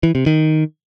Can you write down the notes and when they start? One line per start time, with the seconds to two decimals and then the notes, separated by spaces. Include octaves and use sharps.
0.03 E3
0.15 C3
0.26 D#3